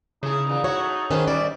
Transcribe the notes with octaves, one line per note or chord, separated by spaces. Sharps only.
C#3 D#4 E4 G#4
A#2 E3
E4 F#4 C#5
A3
D#3 C#4 G#4 B4 C5
G2 D#3 G3 D5